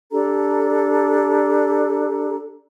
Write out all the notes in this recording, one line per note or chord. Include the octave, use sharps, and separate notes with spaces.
D4 G4 A4 A#5